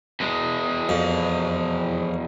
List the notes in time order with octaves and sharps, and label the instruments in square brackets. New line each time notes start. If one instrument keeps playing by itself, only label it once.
[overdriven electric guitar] E2 G#3
[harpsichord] F2